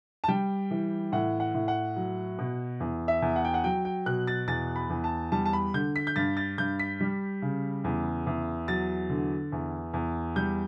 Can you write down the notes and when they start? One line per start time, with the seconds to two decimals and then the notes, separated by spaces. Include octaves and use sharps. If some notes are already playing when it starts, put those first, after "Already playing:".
0.24 A5
0.28 G3 G5
0.71 E3
1.12 A2 F#5
1.40 F#5
1.54 A2
1.68 F#5
1.96 F#3
2.39 B2
2.80 E2
3.08 E5
3.22 E2
3.36 F#5
3.45 G5
3.54 F#5
3.64 F#3 G5
3.85 G5
4.06 B2 F#6
4.27 A6
4.48 E2 A6
4.76 B5
4.90 E2
5.04 A5
5.32 G3 A5
5.46 A5
5.53 B5
5.74 D3 G6
5.96 B6
6.07 G6
6.16 G2 A6
6.37 A6
6.58 G2 G6
6.79 B6
7.00 G3
7.42 C#3
7.84 E2
8.27 E2
8.68 F#3 A6
9.09 D3
9.52 E2
9.94 E2
10.36 G3 G6